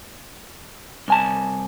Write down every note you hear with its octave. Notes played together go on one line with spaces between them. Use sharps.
C2 G#5 A5